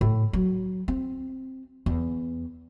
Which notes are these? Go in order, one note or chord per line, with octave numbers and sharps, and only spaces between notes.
A2
F#3
C4
E2